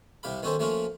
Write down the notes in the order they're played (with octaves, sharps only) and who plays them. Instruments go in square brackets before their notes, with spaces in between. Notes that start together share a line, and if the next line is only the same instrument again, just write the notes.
[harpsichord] C2 C3 G4 F5 B5
D#3 B3 C#4 F#4 A4 C5
F3 A3 A#3 C#4 F4 F#4